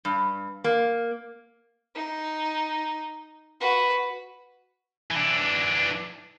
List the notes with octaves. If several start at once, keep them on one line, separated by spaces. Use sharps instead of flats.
G2
A#3
D#4
F#4 B4
E3 D4